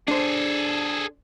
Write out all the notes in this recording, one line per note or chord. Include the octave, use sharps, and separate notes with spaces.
D4 G#4 A4 C5